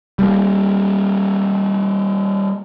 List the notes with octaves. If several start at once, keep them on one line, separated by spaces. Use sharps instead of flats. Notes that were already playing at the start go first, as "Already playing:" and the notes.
G3 A#3